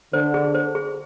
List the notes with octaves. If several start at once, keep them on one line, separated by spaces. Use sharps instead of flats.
D3 C5
G#4
C5
G#4